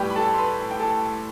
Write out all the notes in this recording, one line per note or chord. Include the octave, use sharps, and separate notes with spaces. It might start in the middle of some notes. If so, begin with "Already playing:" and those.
Already playing: A2 G3 G4 B4 G5
B5
A4 A5
C6
B4 B5
A5
G5
A4 A5